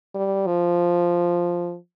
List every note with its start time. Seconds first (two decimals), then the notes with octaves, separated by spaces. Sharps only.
0.15 G3
0.47 F3